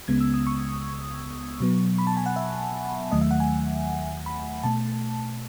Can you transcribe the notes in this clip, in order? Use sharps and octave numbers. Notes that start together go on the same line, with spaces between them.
C#2 C#3 G#3 B3 G#6
E6
D#6
C#6
B2 F#3 B3
B5
A5
G#5
F#5
E5
D#2 D#3 F#3 A3 D#5
E5
F#5
G#5
B5
B2 A3 A5